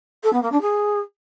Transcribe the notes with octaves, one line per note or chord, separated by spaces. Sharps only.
A4
B3
A#3
D4
G#4